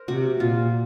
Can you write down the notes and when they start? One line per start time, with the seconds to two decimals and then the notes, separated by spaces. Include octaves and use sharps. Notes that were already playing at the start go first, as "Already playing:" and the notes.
Already playing: A#4 C5
0.08 C3 F#4
0.40 A#2 F4